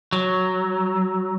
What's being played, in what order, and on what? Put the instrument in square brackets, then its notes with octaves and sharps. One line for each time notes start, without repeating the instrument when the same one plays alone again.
[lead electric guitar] F#3